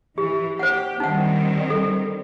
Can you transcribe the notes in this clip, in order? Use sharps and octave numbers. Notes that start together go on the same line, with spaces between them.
E3 G4
G4 C5 F#5
D#3 G3 C4 D#4 F#5
A4